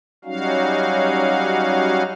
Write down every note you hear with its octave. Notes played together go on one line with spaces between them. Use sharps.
F#3 G3 C#4 D#4 F#4 F5